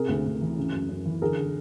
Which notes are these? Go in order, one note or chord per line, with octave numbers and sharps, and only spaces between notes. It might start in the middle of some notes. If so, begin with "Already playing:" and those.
Already playing: C3 G#4 A#4
D2
D2
E3
C#3
F#2
F#2
E3
D3 G#4 A#4
D3